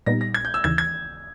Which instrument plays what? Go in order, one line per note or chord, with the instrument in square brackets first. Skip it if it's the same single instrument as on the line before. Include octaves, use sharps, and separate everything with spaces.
[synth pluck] A#2 G3 B3 D#4 [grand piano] A#6
[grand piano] A#6
G#6
G6
E6
[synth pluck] D#2 C#3 E3 [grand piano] G#6
[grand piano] G#6